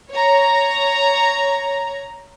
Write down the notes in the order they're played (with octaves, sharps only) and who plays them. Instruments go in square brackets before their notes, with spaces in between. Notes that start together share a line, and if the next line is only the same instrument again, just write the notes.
[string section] C#5 A#5